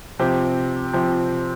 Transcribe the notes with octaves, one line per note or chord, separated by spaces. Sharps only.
C3 F3 C4 G4
C3 F3 C4 G4